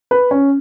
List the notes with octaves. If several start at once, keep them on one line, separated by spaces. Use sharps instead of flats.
B4
C#4